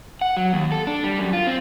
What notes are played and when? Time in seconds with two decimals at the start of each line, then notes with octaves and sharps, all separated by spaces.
0.21 F#5
0.37 F#3
0.53 D#2
0.72 A4
0.87 D4
1.04 G3
1.19 F#2
1.33 F4
1.47 C4